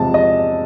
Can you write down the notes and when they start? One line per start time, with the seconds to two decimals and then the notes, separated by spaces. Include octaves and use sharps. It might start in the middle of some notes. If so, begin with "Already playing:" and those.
Already playing: E2 C3 F3 G#3 A5
0.14 D#5